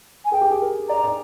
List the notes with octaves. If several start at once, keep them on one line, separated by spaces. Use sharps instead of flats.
G#5
G#4 G5
G4
G#4
A#4
D5 A#5
D5